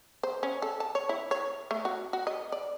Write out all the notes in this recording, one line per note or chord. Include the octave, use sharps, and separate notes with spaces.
C5
C#4
A4
A5
C#5
E4
C#5
A3
F#4
F#4
D#5
D5